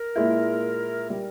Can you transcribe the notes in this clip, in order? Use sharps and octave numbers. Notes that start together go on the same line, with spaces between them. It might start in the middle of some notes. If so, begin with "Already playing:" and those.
Already playing: A#4
A#2 G#3 E4
G3 A#4